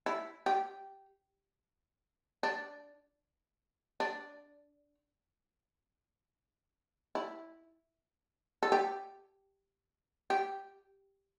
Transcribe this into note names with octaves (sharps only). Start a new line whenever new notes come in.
E4
G4
D4
D4
E4
A4
G4
G4